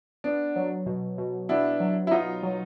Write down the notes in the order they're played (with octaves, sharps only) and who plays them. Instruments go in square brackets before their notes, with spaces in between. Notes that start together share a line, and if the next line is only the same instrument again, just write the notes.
[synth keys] B3 [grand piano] D4
[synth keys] F#3
B2
B2
[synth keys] B3 [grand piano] D4 E4
[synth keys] F#3
[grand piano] E4
[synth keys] B3 [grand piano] D#4 F4
[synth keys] F#3